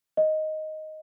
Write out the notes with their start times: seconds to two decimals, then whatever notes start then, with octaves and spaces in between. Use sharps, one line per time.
0.17 D#5